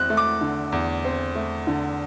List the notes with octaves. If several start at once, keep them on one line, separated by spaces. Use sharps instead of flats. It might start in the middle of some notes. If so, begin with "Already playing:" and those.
Already playing: E2 C4 F#6
A3
D6
D3
E2
C4
A3
D3